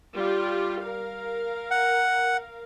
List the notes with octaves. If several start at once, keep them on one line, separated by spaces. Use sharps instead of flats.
G3 F4 G4
A#4 F5
F#5